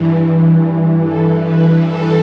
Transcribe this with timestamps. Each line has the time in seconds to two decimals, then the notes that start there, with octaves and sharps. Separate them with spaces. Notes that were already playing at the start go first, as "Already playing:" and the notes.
Already playing: G2 E3
1.03 A4
1.45 B4
1.86 A4